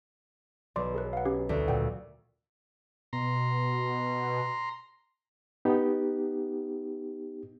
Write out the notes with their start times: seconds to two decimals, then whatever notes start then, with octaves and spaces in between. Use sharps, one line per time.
0.76 B1 D5 C6 D6
0.95 G#4 A#4 B4
1.13 F5 F#5
1.25 C#4 G4
1.49 D2 A3
1.68 A#2 F#5 G5
3.13 B2 A#5 C6
5.65 B3 D#4 G4